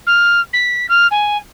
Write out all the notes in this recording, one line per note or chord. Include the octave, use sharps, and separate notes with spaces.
F6
B6
F6
G#5